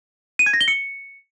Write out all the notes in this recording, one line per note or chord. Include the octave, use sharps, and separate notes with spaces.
D#7
G#6
A#6
G7
C#7